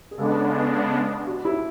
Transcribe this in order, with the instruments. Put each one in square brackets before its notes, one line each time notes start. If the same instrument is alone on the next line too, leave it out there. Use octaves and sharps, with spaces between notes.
[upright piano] G#4
[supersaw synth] C#3 G#3 B3 D4 [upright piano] A4
[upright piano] F#4
E4